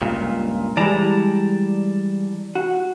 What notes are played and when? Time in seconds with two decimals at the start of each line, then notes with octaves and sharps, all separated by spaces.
0.02 C#2 G2 A#2
0.77 E3 G3 G#3 D5 A5 A#5
2.55 F#4